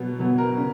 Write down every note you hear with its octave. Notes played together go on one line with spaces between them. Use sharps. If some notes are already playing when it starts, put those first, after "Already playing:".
Already playing: B2 F#3 B3
B2 F#3 B3
A#4
C#3